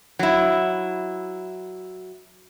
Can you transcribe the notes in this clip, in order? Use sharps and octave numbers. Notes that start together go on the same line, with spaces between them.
F#3 E4